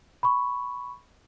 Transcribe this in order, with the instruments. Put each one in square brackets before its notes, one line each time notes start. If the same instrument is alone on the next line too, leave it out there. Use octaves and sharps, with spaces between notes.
[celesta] B5 C#6